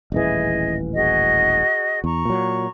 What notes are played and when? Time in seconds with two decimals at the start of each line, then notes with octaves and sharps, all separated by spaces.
0.12 D#1 A1 E3 G#4 D#5
0.94 F#4 G#4 D#5
2.04 E2 A#5 C#6
2.25 A#2 F#3